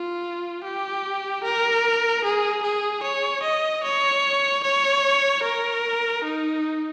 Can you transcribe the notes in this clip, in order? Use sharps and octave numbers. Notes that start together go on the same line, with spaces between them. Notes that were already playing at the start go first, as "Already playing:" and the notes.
Already playing: F4
G4
A#4
G#4
G#4
C#5
D#5
C#5
C#5
A#4
D#4